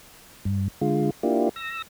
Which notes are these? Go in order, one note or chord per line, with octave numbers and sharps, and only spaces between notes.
G2
D3 G#3 F4
A#3 D4 E4 F4 G4
E6 A#6